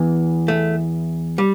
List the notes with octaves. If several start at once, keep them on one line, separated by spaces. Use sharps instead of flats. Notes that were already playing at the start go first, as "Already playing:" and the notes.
Already playing: E2 E3
A3
G3